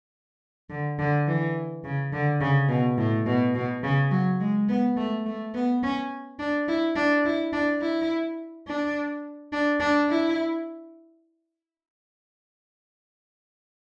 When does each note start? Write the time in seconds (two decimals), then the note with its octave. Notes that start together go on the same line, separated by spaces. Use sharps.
0.70 D3
0.99 D3
1.27 E3
1.84 C#3
2.12 D3
2.41 C#3
2.69 B2
2.98 A2
3.26 B2
3.55 B2
3.83 C#3
4.11 F#3
4.40 G#3
4.69 B3
4.97 A3
5.26 A3
5.54 B3
5.83 C#4
6.39 D4
6.68 E4
6.95 D4
7.25 E4
7.53 D4
7.81 E4
8.67 D4
9.52 D4
9.80 D4
10.09 E4